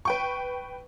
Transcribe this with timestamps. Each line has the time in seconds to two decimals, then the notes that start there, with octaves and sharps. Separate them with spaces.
0.05 B4 G5 C#6